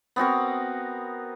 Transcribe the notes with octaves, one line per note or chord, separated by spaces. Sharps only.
B3 C4 F#4 A#4